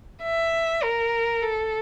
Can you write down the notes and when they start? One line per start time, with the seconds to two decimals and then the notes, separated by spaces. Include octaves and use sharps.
0.23 E5
0.82 A#4
1.42 A4